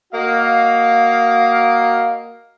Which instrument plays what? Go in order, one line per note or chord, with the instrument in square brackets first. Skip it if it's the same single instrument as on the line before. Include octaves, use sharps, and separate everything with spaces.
[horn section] A#3 F#4 D#5 F5